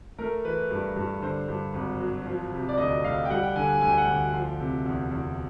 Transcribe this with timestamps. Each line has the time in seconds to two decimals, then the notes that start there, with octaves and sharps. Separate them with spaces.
0.18 A3 A#4
0.44 E3 B4
0.71 G2
0.96 G2
1.22 D3 C5
1.48 G2
1.74 G#1
2.00 F#3
2.26 F3
2.52 C3
2.69 D5
2.78 D2 D#5
3.04 D2 F5
3.25 G5
3.30 G3 F#5
3.43 G5
3.56 D3 G#5
3.69 G#5
3.81 D2 G#5
3.89 G5
3.98 F#5
4.05 D2 G5
4.33 F3
4.60 C3
4.86 E2
5.11 E2